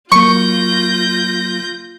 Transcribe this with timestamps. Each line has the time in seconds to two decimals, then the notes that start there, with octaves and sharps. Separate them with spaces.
0.12 F#3 A#3 F4 C#6 G6 A#6